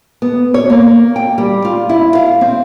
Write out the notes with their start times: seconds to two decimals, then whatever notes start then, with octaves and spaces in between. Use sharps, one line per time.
0.22 B3
0.54 C#5
0.70 A#3
1.16 G5
1.38 G3
1.65 F4
1.89 E4
2.15 F5
2.41 C4